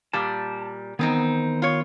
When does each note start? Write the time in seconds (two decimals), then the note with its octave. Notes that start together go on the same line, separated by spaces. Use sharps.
0.13 A#2 G3 A5
0.99 E2 D#3 B3 C4 D#4
1.62 F4 C#5